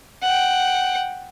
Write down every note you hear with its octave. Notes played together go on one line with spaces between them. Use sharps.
F#5 G5